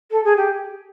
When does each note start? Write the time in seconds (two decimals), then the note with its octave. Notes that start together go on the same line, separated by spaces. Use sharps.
0.11 A4
0.24 G#4
0.37 G4